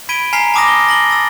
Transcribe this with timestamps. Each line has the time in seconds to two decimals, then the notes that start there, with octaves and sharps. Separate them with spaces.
0.09 B5 G#6 B6 D7 D#7 G7
0.33 G#5 A#5 F6 B6 C7 F7
0.54 A5 B5 D6 D#6 F6 A#6
0.68 G7
0.87 A6 A#6 F#7 G7
1.10 E6 A6